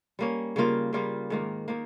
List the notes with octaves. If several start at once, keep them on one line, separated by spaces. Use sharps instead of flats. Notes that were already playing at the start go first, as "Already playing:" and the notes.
G3 A#3 C#4
C#3 G3 A#3 F4
C#3 G3 A#3 F4
G#2 D#3 A#3
D#3 A#3